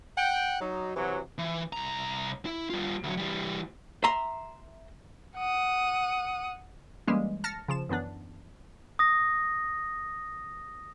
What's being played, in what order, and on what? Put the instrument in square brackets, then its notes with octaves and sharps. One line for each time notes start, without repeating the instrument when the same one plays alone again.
[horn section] F#5 G5
F#3 D#4
C3 E3 F#3
[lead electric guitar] E3
C2 A#5
E4
G3 F4
D2 F#3
E3 G3
[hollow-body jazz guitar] E5 A#5 C6
[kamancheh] F#5 D#6
[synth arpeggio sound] E3 G3 G#3 A#3 C#4
A5 F6 A6 A#6 C#7
C#3 F3 E7
F#2 E3 B3 D4
[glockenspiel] D#6 A#6